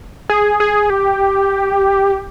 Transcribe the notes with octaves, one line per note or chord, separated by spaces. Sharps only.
G#4
G#4
G4